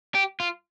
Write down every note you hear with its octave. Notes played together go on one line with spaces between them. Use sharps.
G4
F4